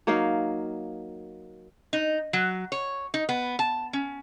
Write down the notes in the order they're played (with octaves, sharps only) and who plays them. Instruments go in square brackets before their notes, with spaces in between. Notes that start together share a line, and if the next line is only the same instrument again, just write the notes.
[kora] F#3 A#3 D#4 F5
[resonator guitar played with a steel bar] D#4
F#3
C#5
D#4
B3
A5
C#4